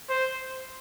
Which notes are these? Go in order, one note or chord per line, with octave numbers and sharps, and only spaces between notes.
C5